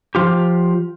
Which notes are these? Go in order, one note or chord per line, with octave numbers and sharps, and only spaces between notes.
F3 F4 G4